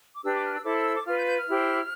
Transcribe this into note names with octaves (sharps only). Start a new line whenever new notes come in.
D6
D4 G4 B4 E6
D6
F6
E6
E4 A4 C5 D6
E6
E6
D6
F4 B4 F6
G6
G6
F6
E4 G4 C5